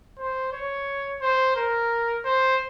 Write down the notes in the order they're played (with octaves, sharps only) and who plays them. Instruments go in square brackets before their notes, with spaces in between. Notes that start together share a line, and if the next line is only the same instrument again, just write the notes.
[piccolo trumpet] C5
C#5
C5
A#4
C5